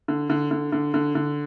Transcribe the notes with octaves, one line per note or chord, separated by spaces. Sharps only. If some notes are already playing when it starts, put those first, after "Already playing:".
D3
D3
D3
D3
D3
D3